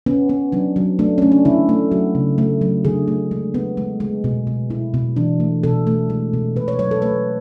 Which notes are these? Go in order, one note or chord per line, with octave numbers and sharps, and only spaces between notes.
B3 C#4
B3
F#3 D4
F#3
A3 D4
A3 C#4
D4
D3 E4
A3
F#3 F#4
C#3
A3
F#3
D3 G#4
A3
G#3
B3
G#3
G#3
B2
B2
B2 E4
B2
E3 D4
A3
B2 A4
A3
G#3
B2
B2 B4
C#5
F#3 C#5
A4
A3 B4